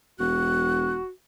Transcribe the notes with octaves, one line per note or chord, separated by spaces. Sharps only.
E1 F#4 F#6